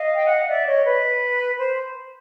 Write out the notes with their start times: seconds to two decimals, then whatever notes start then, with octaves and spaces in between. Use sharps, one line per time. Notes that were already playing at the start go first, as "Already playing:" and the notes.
Already playing: D#5 F5
0.15 G5
0.26 F#5
0.37 F5
0.48 D5 E5
0.66 C#5 D#5
0.85 B4
1.59 C5